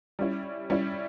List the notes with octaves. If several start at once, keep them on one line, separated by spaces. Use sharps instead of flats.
G3 C#4 E4
G3 C#4 E4